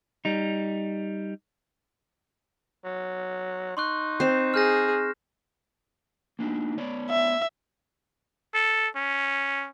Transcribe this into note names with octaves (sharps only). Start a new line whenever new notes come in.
G3 D#4
F#3
D#4 C6 C#6 F#6
C4 C7 E7
G#4 F6 G6 A#6
A#3 D4 D#4
B3 C#5 D5
E5
A4
C#4